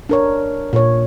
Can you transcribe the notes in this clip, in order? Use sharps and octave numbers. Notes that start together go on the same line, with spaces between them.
D4 A#4 C#5
A#2 C#5